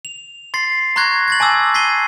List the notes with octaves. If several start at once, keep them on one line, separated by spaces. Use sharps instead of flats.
F7
C6 A6 C7
A#5 C6 C#6 F#6 G#6 A#6
G#6 A6 F#7
G#5 A5 D6 E6 G#6
G#6 B6 C7 D#7 G7